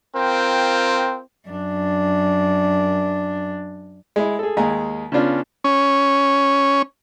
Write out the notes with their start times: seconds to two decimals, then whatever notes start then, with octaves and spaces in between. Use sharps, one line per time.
0.16 C4 F4 A#4 G5
1.49 F#2 D4
4.16 G#3 E4
4.39 G#4 A4
4.57 D#2 G#3 F5 G#5 A#5
5.12 C#3 B3 C#4 D4 F4
5.64 C#4